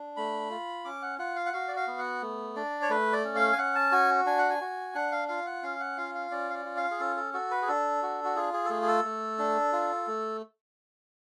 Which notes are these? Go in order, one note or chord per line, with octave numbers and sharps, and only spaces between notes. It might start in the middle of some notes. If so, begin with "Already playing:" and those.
Already playing: D4
A3 B5
F4
C#4 D6
F#5
F4 F#5
F5
F#5
F#4 F5
D5
F5
B3
F#5
A3
D4 D5
C#5
A3 B4
D5
C#4
F5
G#5
C#4 F#5
A5
F#4 G#5
D4 G#5
F#5
G#5
F#4
D4 F#5
F5
F4 F5
F#5
C#4 F5
F#5
F4 F5
F5
C#4 D5
F5
D5
F4
F5
G#4
C#4 A4
A4
F#4 A4
B4
G#4
D4 A4
F#4
F#4
F4 G#4
G#4
A4
A3 G#4
G#4
A4
A3
D4
F4
A3